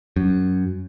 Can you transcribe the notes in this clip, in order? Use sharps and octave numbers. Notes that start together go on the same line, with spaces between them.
F#2